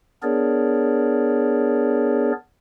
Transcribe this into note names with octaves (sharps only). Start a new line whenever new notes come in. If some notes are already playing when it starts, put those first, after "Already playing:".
B3 D4 G#4 A#4 C#5 D5